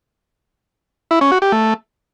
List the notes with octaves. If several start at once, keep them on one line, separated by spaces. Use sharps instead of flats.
E4
C#4
F#4
G4
A3